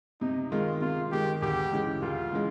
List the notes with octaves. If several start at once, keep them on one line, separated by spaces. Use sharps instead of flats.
C3 D#4
D#3 G#3 F4
C3 F4
D#3 G#3 G4
D2 G4
C#3 E3 G#3
D2 F4
C#3 E3 G#3